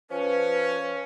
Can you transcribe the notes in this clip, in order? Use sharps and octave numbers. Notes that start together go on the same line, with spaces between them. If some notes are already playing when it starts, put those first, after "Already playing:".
F3 C#4 B4